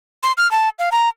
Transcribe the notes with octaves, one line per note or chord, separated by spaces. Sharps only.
C6
F6
A5
F5
A#5